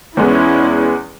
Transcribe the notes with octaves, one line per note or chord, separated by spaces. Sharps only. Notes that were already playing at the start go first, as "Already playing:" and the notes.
E2 G#3 B3 C#4 E4